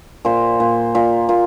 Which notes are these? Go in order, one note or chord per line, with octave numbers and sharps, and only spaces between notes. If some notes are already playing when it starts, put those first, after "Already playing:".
A#2 C5
A#2
A#2
A#2